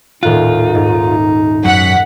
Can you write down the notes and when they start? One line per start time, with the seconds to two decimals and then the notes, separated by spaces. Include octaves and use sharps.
0.23 D#1 A2 D#4 F4 F#6
0.75 G#2
1.65 F#2 F#5 B6